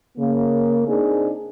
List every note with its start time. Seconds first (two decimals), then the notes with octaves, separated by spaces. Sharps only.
0.18 C#3 A#3
0.87 C4 D4 D#4 G#4